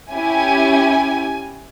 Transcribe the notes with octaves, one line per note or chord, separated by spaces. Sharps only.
C#4 E4 G4 G#5